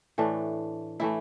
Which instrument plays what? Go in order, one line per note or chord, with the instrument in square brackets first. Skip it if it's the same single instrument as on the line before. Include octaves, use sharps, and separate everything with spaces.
[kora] A2 E3 A3 D4
A2 E3 A3 E4